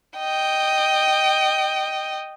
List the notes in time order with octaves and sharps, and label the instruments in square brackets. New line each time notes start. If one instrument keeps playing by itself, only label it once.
[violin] D#5 G5